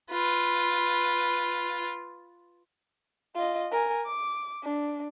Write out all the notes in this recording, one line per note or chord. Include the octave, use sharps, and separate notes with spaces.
F4 B4
F4 D#5
A#4 G#5
D6
D4